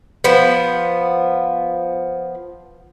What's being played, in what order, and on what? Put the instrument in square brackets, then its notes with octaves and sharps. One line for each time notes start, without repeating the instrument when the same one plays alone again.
[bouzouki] F3 B3